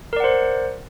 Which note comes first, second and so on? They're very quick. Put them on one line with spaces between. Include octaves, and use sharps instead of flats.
A#4 D5 F#5 C5